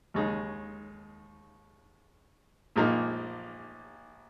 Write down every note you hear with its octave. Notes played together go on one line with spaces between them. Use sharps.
D#2 C#3 G#3 D#4
A#1 A#2 F3 A#3 D#4